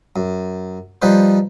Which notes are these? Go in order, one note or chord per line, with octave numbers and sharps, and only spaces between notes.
F#2
F3 G3 D#4 B4 C5